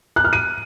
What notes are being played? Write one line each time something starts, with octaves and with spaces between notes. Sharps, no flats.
F#6
F6
D#7